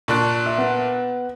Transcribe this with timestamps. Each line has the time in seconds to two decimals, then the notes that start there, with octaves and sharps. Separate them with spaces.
0.08 A#2 D4 C#6 F#6
0.46 E5
0.58 B3